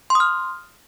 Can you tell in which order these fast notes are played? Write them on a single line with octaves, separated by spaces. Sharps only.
C6 D#6 F6